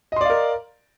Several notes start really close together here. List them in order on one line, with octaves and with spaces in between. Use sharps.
D#5 C6 D5 F5 A#4